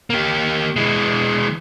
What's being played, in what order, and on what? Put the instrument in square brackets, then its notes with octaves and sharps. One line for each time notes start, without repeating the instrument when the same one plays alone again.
[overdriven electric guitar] A#3 G4
E3 G#3